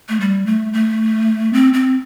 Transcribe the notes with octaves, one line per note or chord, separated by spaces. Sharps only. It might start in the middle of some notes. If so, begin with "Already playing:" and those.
A3
G3
A3
A3
C4
C4